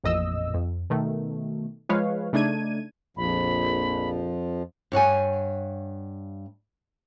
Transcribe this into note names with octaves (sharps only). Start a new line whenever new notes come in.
A1 F2 A#2 D#5 E6
F2
B2 D#3 A3
F3 G#3 B4 C#5 F5
C#3 A3 D4 D#4 G#6 D#7
A#1 F2 F3 B5
G2 C#5 F#5 G#5